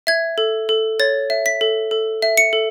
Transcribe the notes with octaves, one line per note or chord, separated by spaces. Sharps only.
E5 G#6
A4
A4
C#5 A6
E5
B6
A4
A4
E5
C#7
A4